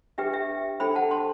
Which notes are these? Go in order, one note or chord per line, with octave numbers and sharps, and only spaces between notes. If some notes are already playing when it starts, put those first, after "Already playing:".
D4 G4 B4 E5 G5
E5 G5
D4 A4 C5 G5 B5
F#5 A5
A5 C6